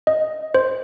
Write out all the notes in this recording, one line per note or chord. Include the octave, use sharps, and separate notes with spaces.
D#5
C5